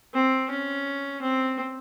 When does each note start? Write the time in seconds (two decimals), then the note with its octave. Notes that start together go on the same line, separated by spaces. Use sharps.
0.14 C4
0.50 C#4
1.22 C4